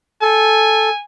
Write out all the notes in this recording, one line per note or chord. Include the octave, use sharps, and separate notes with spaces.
A4 G#5